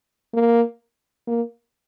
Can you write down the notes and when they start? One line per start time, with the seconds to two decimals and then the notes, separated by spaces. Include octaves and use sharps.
0.34 A#3
1.27 A#3